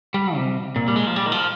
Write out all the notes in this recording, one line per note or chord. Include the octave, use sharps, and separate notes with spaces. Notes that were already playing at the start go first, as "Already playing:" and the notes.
G3
C3
A#2
G3
G#3
F3
G3
D#3
F3